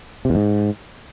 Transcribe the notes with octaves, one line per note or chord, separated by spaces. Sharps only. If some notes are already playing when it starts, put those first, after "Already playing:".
C3
E2
G#2